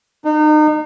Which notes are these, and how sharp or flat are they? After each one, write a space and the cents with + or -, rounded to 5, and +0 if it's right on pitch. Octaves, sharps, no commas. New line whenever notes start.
D#4 -35